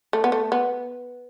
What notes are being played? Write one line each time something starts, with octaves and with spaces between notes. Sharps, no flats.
A3
B3
A3
B3